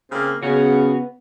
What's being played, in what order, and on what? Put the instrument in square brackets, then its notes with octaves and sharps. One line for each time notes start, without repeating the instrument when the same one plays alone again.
[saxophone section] C#3 A#3 C4
[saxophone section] C#3 [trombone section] B3 [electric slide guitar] C#4 F#4